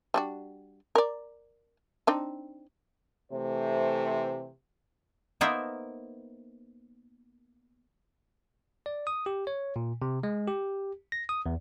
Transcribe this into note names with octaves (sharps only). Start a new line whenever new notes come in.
G3 D4 F#4
A#4 D5
C4 D4 D#4
C3 E3 A3 C5
A#3 B3 D#4 A#4 C5 E5
D5
D#6
G4
C#5
A#2
C3
G#3
G4
A#6
D#6
E2